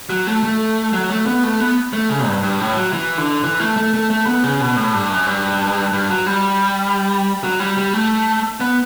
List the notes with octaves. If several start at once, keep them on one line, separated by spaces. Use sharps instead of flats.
F#3
A3
A3
F#3
A3
B3
A3
B3
A3
C#3
G2
G2
A2
F#3
E3
D3
E3
A3
A3
A3
A3
B3
C#3
B2
A2
G2
F#2
G2
G2
F#3
G3
F#3
G3
G3
A3
B3